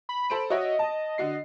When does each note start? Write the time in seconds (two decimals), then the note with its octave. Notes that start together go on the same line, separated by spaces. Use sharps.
0.09 B5
0.30 A4 C5 D7
0.50 F#4 C#5 D#5 E5
0.79 A5
1.18 D3 F#4 C7